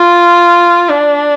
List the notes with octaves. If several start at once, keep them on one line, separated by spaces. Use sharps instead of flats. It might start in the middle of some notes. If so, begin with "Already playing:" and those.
Already playing: F4
D4